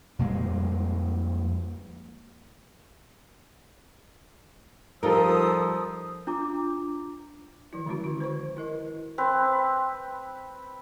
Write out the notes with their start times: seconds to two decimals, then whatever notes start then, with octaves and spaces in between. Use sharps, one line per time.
0.19 F2 A#2 G3 G#3
5.03 F3 G3 D#4 F4 A4 A#4 D#6 E6
6.27 D4 F4 A#5 D6
7.73 D#3 F3 E4
7.86 D3 G#3 C#4 F#4
8.04 D#3 F#4
8.20 B4 C5 C#6
8.57 E4 A#4 D#5
9.18 C4 B4